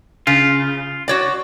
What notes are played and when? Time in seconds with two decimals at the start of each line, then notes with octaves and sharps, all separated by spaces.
0.27 C#3 F4
1.08 F#4 C#5 D5